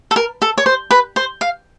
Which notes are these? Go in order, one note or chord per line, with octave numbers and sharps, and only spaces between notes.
A4
A#4
A4
C#5
C5
B4
C5
F5